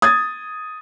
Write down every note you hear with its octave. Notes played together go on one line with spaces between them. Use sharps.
D#6 G#6 A6